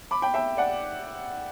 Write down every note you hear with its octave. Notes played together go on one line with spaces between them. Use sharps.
B5 D6
G5 B5
E5 G5
D5 F#5